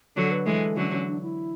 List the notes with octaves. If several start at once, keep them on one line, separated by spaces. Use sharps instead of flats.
D3 F#3 A4
B4
E3 G#3 A4
D3 F#3 C#4
C#4
D4
E4